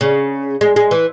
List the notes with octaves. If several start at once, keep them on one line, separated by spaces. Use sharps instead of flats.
C#3
G#3
G#3
E3